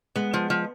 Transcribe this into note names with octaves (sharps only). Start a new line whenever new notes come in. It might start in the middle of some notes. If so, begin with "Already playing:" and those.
G#3 B3
F3
F3